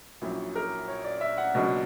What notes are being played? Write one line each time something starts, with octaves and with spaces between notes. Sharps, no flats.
A#1 A#2 F#3 C#4 E4
A#4
C#5
D5
E5
F#5
C#2 B2 F#3 A#3 D4